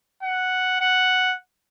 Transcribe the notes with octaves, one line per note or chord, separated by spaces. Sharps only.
F#5
F#5